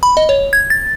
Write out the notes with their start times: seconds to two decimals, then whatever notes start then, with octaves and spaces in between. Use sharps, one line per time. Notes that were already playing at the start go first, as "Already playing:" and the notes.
0.03 B5
0.17 D#5
0.29 C#5
0.53 G#6
0.70 A6